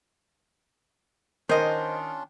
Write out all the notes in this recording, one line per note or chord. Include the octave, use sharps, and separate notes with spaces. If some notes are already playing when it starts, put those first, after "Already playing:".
D#3 C#4 D4 F4 C5 D#5